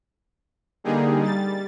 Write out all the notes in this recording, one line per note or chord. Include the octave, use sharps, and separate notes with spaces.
D3 G3 A#3 D#4 G4 G#4
G3 A6